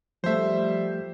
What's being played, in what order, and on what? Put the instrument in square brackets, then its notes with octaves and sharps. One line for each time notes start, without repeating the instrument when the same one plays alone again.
[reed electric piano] F3 A3 [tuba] G3 [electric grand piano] C5 E5